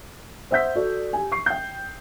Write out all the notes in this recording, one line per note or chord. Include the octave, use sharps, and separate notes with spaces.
C5 E5 F#5 E6 G6 B6
F#4 A4 D5
G4 G#5
C#6 C7
G5 G6